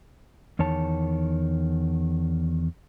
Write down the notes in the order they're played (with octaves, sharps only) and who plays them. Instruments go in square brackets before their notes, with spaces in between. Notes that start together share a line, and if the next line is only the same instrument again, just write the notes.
[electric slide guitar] E2 D#3 C#5 A5